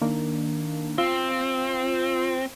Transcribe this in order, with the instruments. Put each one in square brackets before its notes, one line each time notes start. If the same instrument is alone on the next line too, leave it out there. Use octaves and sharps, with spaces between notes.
[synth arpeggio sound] D#3 A#3 D4
[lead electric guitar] C4 [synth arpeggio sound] F4